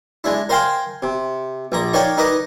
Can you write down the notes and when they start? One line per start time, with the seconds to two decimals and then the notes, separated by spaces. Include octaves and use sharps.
0.24 G#3 D4 E4
0.49 A#4 C5 F5 G5 G#5 C6
1.03 C3
1.72 A#1 A#3 A#5
1.93 D#4 A#4 C#5 D5 F5 G5
2.17 D#4 A#4 B4 D#5 D6